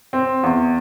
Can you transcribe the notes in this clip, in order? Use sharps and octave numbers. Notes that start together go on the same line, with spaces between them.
C4
E2